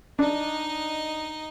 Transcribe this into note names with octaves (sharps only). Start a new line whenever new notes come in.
D4 D#4 D#5